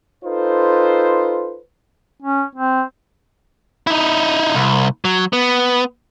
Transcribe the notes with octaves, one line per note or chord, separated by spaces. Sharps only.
D#4 F4 A4 B4 C5
C#4
C4
D#4 E4
C2
F#3
B3